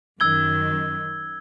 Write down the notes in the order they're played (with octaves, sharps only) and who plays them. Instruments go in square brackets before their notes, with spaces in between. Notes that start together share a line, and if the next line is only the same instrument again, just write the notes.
[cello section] F#2 D#3 [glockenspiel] E6 G#6 G7